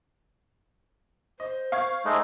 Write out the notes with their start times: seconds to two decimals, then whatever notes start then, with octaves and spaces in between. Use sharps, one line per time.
1.40 C5 D#5
1.72 F5 C#6 G#6
2.05 G#3 A3 D#4